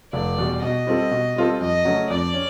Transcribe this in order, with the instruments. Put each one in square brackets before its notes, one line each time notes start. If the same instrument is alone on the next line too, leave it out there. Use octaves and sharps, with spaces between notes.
[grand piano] F1 [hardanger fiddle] D5
[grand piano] E2 B2 G3
[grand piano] B2 [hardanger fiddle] D#5
[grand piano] G3 C4 F4 A4
B2
G3 C4 F4 A4
[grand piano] F2 [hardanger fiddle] D#5
[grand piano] C#3 F#3 A3 C#4
[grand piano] F2 [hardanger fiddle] D5
[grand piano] C#4